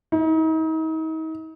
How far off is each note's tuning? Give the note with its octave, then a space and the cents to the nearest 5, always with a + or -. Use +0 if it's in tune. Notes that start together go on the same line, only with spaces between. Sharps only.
D#4 +40